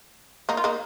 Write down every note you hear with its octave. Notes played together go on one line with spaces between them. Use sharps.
A#3 D#4
F4
A#3 D#4